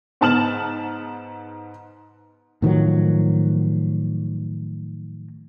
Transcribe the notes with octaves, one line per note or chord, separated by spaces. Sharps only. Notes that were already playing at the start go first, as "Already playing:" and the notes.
G#2 B3 A5 F6 E7 F#7
A2 D#3 F3 F#3